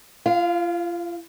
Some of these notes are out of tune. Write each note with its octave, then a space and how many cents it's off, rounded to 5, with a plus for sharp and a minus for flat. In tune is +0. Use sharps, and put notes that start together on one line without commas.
F4 -35 F5 +5